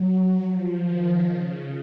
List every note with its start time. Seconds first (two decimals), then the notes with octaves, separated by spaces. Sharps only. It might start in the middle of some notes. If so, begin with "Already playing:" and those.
Already playing: F#3
0.47 F3
0.83 D#3
1.20 C#3